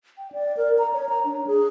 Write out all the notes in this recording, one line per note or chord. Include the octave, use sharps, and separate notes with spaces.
G5
D5
A#4
A#5
C#5
A#5
D4
G#4